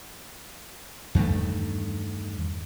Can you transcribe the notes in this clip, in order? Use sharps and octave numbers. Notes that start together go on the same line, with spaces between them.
E2 G2 D#3 A3